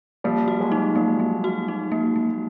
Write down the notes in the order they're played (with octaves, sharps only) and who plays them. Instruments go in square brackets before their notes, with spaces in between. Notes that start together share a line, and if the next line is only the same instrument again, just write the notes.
[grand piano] F3 G3 [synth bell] A#3
[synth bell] F#4
[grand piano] F#3 G#3
[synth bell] D#4
[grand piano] F3 G3 [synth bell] A#3
[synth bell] A#3
F#4
D#4
A#3
A#3